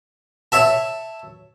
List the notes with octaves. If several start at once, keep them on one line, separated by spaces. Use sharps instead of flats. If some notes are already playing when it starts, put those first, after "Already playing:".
C#5 E5 A5